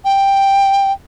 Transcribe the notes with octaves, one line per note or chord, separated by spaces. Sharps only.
G5